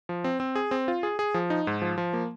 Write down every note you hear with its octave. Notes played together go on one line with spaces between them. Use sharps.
F3
C4
C4
G#4
C4
F4
G#4
G#4
F3
D#4
G#2
F3
F3
A#3